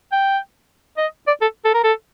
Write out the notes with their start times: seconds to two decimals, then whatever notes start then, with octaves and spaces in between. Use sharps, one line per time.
0.12 G5
0.97 D#5
1.27 D5
1.41 A4
1.64 A4
1.74 A#4
1.84 A4